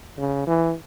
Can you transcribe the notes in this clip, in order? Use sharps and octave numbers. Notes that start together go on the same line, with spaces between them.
C#3
E3